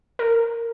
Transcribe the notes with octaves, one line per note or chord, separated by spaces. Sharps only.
A#4